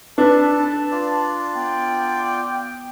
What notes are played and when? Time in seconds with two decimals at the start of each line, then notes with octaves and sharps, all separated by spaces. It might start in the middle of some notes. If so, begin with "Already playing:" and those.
0.18 D4 A4 B4 A5
0.92 F4 D5
1.56 B3 G5